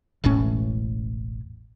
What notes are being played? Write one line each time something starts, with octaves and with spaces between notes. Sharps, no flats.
E1 A1 A2 C#4